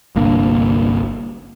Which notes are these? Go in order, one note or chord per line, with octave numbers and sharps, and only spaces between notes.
G1 C2 A#3 D4